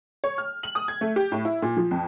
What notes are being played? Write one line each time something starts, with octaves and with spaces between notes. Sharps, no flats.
C#5
F6
F#7
D#6
G#6
A3
G4
A2
E4
A#2
F3
F2